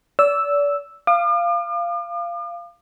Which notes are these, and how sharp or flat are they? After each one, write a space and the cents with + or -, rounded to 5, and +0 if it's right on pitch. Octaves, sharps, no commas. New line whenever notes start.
D5 -35 E6 +0
F5 -15 D6 +45